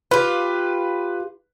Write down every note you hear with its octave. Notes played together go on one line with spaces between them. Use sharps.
F4 G4 B4